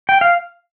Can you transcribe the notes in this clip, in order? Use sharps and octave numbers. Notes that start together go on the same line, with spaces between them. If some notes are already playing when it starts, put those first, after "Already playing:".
G5
F5